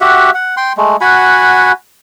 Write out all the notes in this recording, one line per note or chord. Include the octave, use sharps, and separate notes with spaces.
F#4 G4 E5 F#5
F#5
G5 C6
G#3 A3
F#4 F#5 G#5 B5